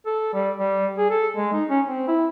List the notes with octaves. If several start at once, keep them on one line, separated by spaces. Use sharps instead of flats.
A4
G3
G3
G#4
A4
G#3
D#4
C#4
C4
E4